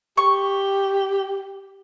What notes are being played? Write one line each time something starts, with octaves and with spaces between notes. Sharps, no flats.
G4 C#6